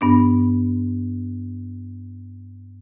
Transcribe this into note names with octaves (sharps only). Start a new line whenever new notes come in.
G2 B3 D4